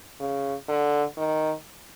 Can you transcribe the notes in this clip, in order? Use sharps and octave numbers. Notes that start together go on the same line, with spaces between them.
C#3
D3
D#3